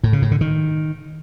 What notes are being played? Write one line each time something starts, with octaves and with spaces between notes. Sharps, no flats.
A2
C#3
A2
D3
D#3